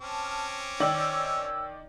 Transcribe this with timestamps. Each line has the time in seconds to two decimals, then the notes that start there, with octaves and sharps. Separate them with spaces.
0.01 C4 C#4 A5 D6 F6
0.80 D#3 C#5 D5 E6 F#7